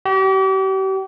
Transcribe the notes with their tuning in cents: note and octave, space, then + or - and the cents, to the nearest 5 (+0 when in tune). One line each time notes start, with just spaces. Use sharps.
G4 -40